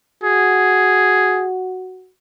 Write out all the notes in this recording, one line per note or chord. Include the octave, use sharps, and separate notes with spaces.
F#4 G#4